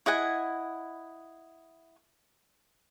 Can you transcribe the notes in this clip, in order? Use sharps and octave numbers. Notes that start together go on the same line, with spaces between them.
E4 D#5 F#5 G#5